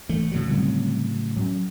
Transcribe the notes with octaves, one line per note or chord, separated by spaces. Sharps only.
E3 A3
A2 C#3 F#3
D3 G3 C4
F#3 C#4